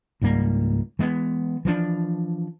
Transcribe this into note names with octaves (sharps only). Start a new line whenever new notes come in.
C#2 G#2 G3 A#3
E3 G#3 B3
E3 F3 D4